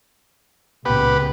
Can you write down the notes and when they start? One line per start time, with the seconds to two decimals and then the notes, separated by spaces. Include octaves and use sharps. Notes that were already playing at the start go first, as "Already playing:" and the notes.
0.85 C#2 A#2 B3 G4 B4